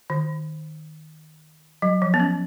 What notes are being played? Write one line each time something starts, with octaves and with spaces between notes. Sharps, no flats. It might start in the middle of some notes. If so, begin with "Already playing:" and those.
D#3
F#3
F3
B3
C#4